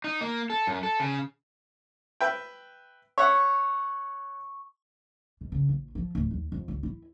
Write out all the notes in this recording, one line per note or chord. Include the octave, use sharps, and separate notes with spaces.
D#4
A#3
A4
F#2
A4
C#3
B4 E5 G5
C#5 E5 F#5 C#6
B2
C#3
A#1
F3
D1
D#2
F2
C#2
E4